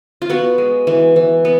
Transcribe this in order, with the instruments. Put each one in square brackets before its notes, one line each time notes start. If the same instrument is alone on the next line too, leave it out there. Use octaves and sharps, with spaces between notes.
[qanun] F4
B3 F#4
G#3
E3
E3
B3